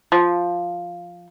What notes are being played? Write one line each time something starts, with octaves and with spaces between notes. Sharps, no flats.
F3